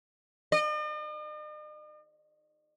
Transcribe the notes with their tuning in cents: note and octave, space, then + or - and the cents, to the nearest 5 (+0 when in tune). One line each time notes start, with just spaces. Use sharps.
D#5 -45